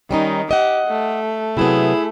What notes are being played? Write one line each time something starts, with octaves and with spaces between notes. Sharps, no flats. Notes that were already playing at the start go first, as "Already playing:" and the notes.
D#3 G3 C#4 D#4
G4 D#5 F#5
A3
C3 F#3 B3 E4 G#4